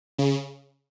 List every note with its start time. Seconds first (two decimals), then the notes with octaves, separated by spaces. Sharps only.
0.18 C#3